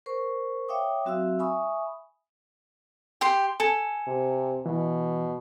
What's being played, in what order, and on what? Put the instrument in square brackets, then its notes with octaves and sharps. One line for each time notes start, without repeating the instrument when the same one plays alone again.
[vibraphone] A#4 C5 C#6
C#5 E5 F5 G5 D6 D#6
F#3 C4 F#4 E5 F5 E6
E5 G#5 B5 C#6 D#6
[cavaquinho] G4 C6
[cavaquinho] A4 [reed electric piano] G#5
[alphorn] C3
[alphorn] B2 [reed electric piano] E3